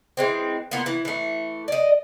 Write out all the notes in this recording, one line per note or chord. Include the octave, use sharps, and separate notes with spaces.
E3 G#3 C4
A#3 B3 F4
E3
E3 A3
D5 D#5